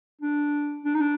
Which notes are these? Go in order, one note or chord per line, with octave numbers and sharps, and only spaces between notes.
D4
D4
D#4
D4